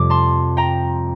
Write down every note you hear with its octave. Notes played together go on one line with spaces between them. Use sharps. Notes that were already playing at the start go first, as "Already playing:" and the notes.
Already playing: F2 C3 G3 D6
A5 C6
G5 A#5